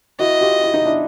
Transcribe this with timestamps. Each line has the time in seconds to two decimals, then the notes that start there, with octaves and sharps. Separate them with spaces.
0.20 E4 F#4 D#5
0.41 F4 G4
0.64 E4
0.74 D#4
0.85 D4 E4